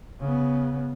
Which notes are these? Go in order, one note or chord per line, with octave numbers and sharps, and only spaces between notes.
C#3 B3